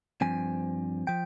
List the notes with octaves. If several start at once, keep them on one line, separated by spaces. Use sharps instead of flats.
G2 F3 C4 G#5
F3 G5